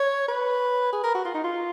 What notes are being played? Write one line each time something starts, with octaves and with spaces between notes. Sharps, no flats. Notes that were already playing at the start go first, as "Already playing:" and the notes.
Already playing: C#5
B4
G#4
A#4
F#4
F4
D#4
F4